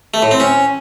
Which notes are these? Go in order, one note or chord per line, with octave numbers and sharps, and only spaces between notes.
A3
A2
C4
C#4